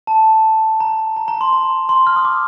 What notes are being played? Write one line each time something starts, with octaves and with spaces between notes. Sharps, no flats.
A5
A#5
A#5
A#5
C6
A#5
C6
F6
D#6
D6